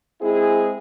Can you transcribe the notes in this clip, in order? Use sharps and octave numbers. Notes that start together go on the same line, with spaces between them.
G#3 C4 E4 G#4